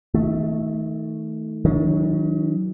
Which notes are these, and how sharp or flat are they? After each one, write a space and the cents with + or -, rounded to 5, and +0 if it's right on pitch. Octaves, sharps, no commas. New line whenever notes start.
D#3 +35 A3 +0
D#3 +40 F#3 +0 D4 +0